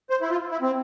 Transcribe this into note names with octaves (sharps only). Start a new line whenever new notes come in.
C5
E4
F4
E4
C4